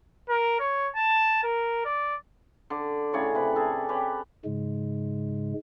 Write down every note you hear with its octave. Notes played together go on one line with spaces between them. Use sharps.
A#4
C#5
A5
A#4
D5
D3 D5
A2 C#3 C#5 D5
C3 B4
G#4 A4
G4 B4 C#5
G#2 C#3 G#3